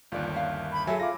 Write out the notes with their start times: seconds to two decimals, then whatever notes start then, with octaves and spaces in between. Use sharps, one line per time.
0.12 G1 D#2 F4 D5
0.33 C#4 E4 F5
0.72 B5
0.87 F#3 G#4 A4 E5 G#5
1.00 F4 D6 A#6